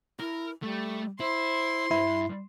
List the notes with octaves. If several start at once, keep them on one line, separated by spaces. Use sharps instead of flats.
E4 A#4
G3 A3
E4 C5 C6
G2 E4